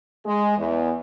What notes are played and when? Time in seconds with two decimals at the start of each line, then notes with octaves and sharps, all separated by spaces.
0.25 G#3
0.57 E2